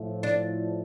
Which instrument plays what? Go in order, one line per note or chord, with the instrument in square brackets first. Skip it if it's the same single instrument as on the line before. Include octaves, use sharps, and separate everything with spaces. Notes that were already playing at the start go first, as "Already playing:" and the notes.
Already playing: [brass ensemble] A2 F3 A3
[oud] D4